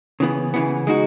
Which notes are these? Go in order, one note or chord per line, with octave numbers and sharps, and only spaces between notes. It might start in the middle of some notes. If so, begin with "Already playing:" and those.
C#3 E3 B3
C#3 E3 B3
G#3 D#4 F#4